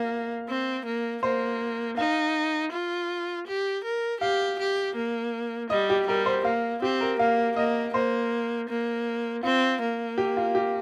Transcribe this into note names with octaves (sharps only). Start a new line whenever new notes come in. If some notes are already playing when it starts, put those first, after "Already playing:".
Already playing: A#3 F5
C4
A#3
A#3 C5
D#4 F5
F4
G4
A#4
G4 F5
G4
A#3
G3 D#5
G4
G3 A#4
C5
A#3 F5
C4 G4
A#4
A#3 F5
A#3 D#5
A#3 C5
A#3
C4 F4
A#3
G4
F4
G4